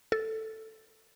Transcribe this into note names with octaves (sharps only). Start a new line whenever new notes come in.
A4